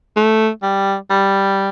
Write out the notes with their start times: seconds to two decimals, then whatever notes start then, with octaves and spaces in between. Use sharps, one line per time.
0.16 A3
0.62 G3
1.10 G3